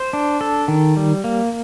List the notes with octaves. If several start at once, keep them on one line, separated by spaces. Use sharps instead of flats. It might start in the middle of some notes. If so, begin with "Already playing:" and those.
Already playing: C5
D4
A4
D#3
G3
A#3